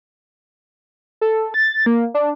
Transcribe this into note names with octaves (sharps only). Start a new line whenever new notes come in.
A4
A6
A#3
D4